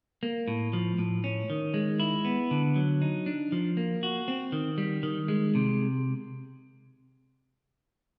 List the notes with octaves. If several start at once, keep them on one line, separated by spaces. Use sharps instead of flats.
A#3
A2
F3
A2
C#4
D#3
G#3
E4
B3
D3
F#3
D#4
D4
F3
A#3
F#4
C4
D#3
G3
D#3
G#3
C3